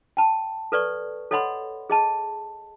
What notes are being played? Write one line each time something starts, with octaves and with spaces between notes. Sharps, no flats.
G5 A5
A4 B4 D5 C#6
A4 C#5 D#5 F#5 B5 C6
G#4 D#5 A5